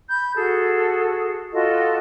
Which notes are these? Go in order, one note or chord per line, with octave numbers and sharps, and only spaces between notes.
B5 G6
F#4 G#4 A4
F4 F#4 A4 D#5